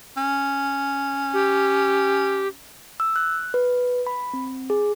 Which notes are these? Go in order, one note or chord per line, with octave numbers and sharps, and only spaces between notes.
C#4
G4
E6
F#6
B4
B5
C4
G#4